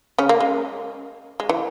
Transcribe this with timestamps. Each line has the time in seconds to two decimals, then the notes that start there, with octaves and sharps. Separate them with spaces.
0.18 C#3 C#4
0.29 A#3
0.40 G#3
1.40 G#3
1.49 E3